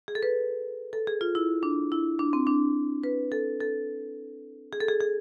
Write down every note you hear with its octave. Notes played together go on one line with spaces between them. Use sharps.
G#4
A4
B4
A4
G#4
F4
E4
D4
E4
D4
C4
D4
B4
A4
A4
G#4
A4
G#4
G#4